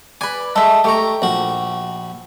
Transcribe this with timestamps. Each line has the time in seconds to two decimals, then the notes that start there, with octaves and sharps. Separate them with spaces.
0.21 B4 D5 G#5
0.56 G#3 A4 E5
0.84 A3 G4 A#5 C#6
1.22 A#1 F#4